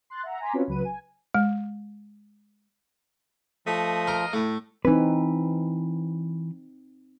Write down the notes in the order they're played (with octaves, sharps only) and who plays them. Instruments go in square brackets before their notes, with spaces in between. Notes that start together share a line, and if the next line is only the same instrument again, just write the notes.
[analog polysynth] C6 F#6 A6
E5 F#5 A#5
G#5 A#5 C6 D6 B6
C4 C#4 F4 F#4 B4 C#5
C#2 F#3 B4 D#7
G#5
[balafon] G#3
[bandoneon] F3 [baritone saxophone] A3 [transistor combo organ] D#5
[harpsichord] A#4 C6
[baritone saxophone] A2 [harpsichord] A3
[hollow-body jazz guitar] E3 B4 [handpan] C4 D#4